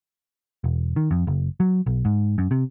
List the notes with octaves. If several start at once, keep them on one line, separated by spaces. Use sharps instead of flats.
E1
D#3
F2
F#1
F#3
B1
G#2
F#2
C3